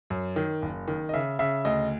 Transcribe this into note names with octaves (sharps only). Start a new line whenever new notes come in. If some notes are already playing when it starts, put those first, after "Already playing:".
F#2
D#3
F#1
D#3
D#5
C#3 E5
C#3 E5
D2 D#5